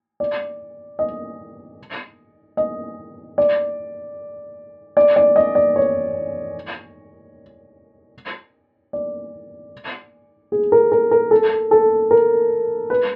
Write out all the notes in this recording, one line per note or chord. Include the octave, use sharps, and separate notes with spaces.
D5
D#5
D#5
D5
D5
D5
D#5
D5
C#5
D5
G#4
A#4
A#4
A#4
A4
A4
A#4
B4